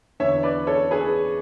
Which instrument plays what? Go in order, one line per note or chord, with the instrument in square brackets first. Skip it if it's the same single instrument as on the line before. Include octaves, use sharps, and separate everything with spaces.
[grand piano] E2 D3 C#5 E5
B4 D5
A4 C#5
G#4 B4